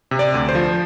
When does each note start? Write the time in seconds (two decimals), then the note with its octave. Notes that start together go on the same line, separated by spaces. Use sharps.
0.11 C3
0.19 D5
0.34 D2
0.49 C5
0.55 F3